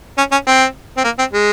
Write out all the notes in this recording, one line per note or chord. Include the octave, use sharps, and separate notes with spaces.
C#4
C#4
C4
C4
A#3
C4
G#3